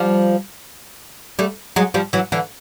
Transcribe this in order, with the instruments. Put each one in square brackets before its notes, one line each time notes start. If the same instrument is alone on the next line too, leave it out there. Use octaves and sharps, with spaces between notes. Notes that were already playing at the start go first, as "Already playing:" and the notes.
Already playing: [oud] F3 G3
G3 A3
F#3 G#3
F3 G3
E3 F#3
D3 E3